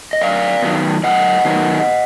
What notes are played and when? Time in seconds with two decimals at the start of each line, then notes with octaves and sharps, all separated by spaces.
0.13 D#5
0.21 F#2 D5 F5
0.62 D#3 F#3 B3
1.03 F#2 D#5 F#5
1.45 D#3 F#3 B3